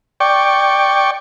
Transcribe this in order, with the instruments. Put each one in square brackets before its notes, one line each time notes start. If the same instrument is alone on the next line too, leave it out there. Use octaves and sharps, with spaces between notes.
[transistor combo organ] D5 G5 C#6